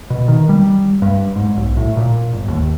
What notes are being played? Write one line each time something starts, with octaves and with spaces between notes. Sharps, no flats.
B2
D#3
G3
G2
G#2
B1
A2
A#2
G1
D#2